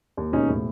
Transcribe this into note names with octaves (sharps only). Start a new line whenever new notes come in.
D#2
E1 C#4 D#4
A2